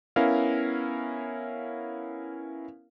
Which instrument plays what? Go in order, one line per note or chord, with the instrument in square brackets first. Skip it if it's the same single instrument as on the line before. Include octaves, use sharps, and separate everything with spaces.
[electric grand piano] B3 C#4 E4 A#4 F5